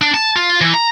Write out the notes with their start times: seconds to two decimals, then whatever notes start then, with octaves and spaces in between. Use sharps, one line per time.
0.01 D4
0.14 A5
0.36 F4
0.61 E3
0.74 A#5